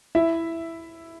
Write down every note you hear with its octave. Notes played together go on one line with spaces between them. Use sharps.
E4 E5